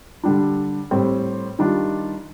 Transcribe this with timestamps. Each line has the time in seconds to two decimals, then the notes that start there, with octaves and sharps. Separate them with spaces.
0.24 D3 G3 D4
0.91 A2 G3 C4
1.59 D#3 G3 D4 F4